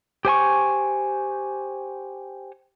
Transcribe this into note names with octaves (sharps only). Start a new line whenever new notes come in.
G4 C5 G#5 C#6